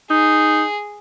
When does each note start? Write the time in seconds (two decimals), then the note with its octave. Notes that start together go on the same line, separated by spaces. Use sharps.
0.10 D#4 G#4